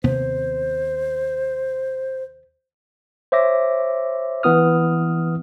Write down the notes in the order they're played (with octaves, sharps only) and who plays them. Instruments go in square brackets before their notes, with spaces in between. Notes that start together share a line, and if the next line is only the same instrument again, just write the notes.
[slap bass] D#2 C3 B3 [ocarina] C5
[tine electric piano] C5 C#5 E5 D6 A#6
E3 B3 E4 D#6 F6